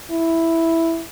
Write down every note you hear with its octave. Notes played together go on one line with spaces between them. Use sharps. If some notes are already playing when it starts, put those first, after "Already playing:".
E4